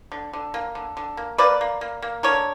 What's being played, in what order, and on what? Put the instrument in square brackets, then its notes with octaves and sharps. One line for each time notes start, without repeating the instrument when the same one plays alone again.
[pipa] D3
D3
A#3
D3
D3
A#3
A#3 B4 D5
A#3
A#3
A#3
D3 A#4 C#5